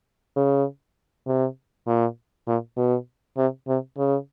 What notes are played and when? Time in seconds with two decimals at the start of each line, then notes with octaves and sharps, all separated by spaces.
0.36 C#3
1.27 C3
1.87 A#2
2.47 A#2
2.77 B2
3.37 C3
3.68 C3
3.98 C#3